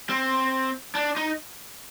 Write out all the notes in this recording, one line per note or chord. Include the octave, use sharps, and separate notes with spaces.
C4
D4
D#4